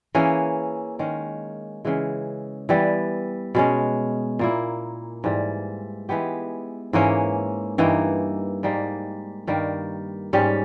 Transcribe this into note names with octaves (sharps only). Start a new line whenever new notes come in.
E3 A#3 C#4 G#4
D#3 G#3 C#4
C#3 E3 G#3
E3 G3 B3
B2 G#3 C#4
A#2 A#3 E4
G#2 E3 G3
E3 G#3 B3 G4
G#2 E3 A#3 C#4
G2 E3 A#3 D#4
G#2 G3 A#3 D#4
G2 D#3 G3 A#3
G#2 G3 C#4 G4